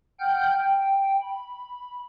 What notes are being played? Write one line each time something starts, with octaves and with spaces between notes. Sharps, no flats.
F#5 G5 F6 G6
G5
B5